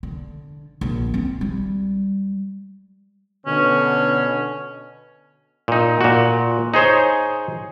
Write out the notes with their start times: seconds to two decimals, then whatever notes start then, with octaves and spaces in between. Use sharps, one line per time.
0.03 D3
0.81 A#1
1.14 C4
1.41 G3
3.47 B2 D3 C#4
5.68 A#2 D#4
6.01 A#2 F#4
6.74 D#4 G#4 C5 C#5